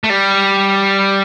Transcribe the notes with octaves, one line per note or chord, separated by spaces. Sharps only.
A3
G3